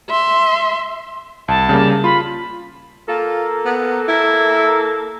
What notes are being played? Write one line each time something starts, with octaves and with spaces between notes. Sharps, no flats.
E5 C6
C2 A5
C#3 G3 A#3
F4 B5
A#3 F4 A4
B3
E4